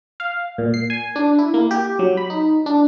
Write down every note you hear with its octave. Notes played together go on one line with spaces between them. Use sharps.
F5
A#2
C7
G#5
D4
E4
A#3
G4
F#3
B5
D#4
D4